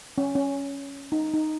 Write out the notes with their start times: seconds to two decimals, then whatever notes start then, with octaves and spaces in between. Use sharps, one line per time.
0.18 C#4
0.35 C#4
1.12 D#4
1.33 D#4